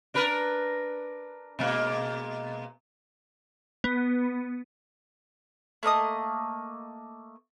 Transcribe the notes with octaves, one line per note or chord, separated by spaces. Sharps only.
D4 A#4 B4
B2 G#3 A#3
B3
A3 A#3 D#5 D#6